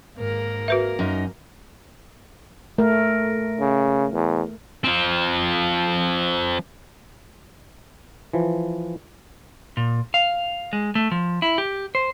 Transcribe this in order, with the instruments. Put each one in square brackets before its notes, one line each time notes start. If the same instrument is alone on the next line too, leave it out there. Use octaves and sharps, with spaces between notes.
[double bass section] G#1 G#2 [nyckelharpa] A#3 A#4
[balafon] F#4 B4 E5
[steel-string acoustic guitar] F#2 D#4
[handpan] A3 A#4
[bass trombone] C#3
E2
[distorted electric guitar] F3 C4
[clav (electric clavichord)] E3 F3
[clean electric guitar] A#2
F5
G#3
A3
F3
E4
G4
C5